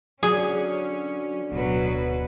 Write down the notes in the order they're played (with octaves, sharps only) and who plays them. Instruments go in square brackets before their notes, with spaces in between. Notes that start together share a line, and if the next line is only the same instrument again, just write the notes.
[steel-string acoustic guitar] D3 [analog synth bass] F#3 [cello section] C#4 [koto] G#4
[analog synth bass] D1 [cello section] B2 F#3 B4